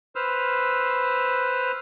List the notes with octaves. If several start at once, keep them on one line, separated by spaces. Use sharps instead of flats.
B4 C5 E6 F6